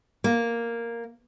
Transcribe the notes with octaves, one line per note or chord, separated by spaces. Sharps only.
A#3